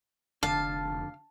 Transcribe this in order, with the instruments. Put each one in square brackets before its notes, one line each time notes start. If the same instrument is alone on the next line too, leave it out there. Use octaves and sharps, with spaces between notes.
[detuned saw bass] F1 [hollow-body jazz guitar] D3 [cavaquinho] F5 [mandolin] A5